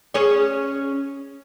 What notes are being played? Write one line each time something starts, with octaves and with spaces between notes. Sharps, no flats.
C#4 G#4 C#5